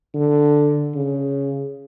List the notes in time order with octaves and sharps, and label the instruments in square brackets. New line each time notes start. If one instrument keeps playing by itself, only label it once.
[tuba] D3
C#3